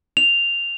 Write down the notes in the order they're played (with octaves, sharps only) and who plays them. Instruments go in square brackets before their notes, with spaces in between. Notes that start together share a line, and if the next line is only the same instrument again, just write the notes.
[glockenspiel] F7